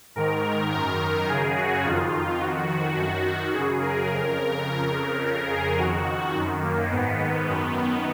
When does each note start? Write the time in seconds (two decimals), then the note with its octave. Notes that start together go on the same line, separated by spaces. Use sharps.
0.16 G#2 D#3 A#4
0.72 F#2 D#3 A#4
1.28 F#2 C#3 G#4
1.57 F#4
1.84 F2 D#3 F4
2.41 F2 D#3 F#4
2.96 F#2 D#3
3.53 F#2 C#3 G#4
3.82 A#4
4.09 F2 C#3
4.66 F2 C#3
5.21 F2 C#3 A#4
5.50 G#4
5.78 F2 D#3 F#4
6.34 F#2 D#3
6.62 A#3
6.90 G#2 D#3 B3
7.47 F#2 D#3